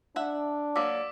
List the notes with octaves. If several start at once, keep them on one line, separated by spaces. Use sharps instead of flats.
D4 E5 F#5
F#3 A#3 D5 D6 E6 B6